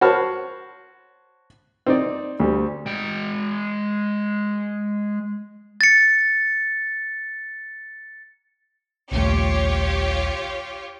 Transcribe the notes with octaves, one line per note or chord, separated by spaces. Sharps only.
F#4 C5 C#5 A5 B5 F6
C4 D#4 D5
D2 G3
G#3 G5
A6 C#7
A#1 D#2 A3 F4 G4 C#5